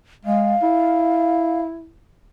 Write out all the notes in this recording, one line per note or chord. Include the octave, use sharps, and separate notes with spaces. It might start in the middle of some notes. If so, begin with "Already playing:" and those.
G#3 F5
E4